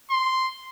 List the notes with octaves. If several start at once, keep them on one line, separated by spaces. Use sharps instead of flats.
C6